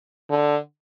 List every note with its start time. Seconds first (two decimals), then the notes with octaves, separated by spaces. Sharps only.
0.30 D3